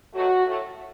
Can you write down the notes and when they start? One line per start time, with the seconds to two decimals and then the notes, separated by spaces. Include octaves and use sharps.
0.14 B2 F#3 A3 F#4
0.46 A2 A3